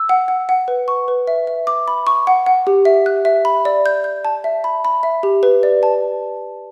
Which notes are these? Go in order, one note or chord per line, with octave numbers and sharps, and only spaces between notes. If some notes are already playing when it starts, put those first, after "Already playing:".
Already playing: E6
F#5
F#5
F#5
B4
C#6
B4
E5
E5
D6
B5
C#6
F#5
F#5
G4
E5
F#6
E5
B5
D5
G6
G6
A5
E5
B5
B5
E5
G4
B4
D5
A5